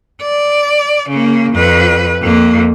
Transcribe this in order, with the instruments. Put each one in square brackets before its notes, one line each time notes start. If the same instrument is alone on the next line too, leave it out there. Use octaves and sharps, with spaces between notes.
[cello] D5
C#3 A#3
F2 B4
F2 A#3